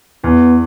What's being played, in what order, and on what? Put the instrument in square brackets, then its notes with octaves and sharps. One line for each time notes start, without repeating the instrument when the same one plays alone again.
[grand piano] E2 [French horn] B3